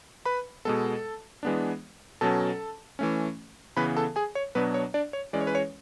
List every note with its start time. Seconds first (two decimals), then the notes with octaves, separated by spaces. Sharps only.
0.25 B4 B5
0.65 B2 G#3 B3 A4 A5
1.43 E3 G#3 B3 D4
2.21 B2 F#3 C#4 A4 A5
2.99 E3 A3 C#4
3.77 C#3 E3 B3 B4 B5
3.97 A4 A5
4.16 G#4 G#5
4.35 C#5
4.55 B2 F#3 B3 D4 B4
4.74 C#5
4.94 D4 D5
5.13 C#5
5.33 E3 G#3 C#4 D5
5.41 C#5
5.47 B4
5.55 C#5